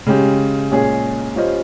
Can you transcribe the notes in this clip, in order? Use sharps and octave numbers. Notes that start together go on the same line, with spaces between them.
C#3 G#3 C#4 G4
A#2 G#3 C#4 G#4
G3 C#4 F4 C5 D#5